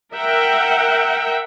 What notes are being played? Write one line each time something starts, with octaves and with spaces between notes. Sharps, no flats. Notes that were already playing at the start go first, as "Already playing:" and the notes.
A#4 E5 F#5 G5